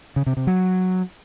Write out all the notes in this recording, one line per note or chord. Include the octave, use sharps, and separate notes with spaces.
C#3
C3
C3
F#3